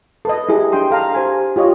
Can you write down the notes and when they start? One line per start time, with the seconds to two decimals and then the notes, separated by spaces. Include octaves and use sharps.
0.25 A4 B4 D#5
0.49 E4 G4 G#4 D#5
0.72 D4 G#4 G5 C6 D#6
0.91 A4 F5 A#5
1.15 G4 C5 G#5
1.56 F4 G4 C#5 D#5